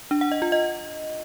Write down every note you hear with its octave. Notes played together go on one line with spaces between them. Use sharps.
D4
F#5
D#5
F4
D#5